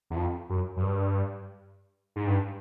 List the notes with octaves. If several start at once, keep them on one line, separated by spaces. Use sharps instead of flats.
E2
F2
F#2
F#2
G2
G#2
G2